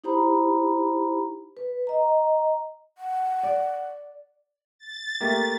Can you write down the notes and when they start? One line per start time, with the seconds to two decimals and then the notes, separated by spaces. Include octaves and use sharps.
0.04 D#4 E4 G4 C5 A#5 B5
1.57 B4
1.87 D#5 A#5
2.98 F#5
3.43 D5
4.79 A6
5.21 A3 A#3 G4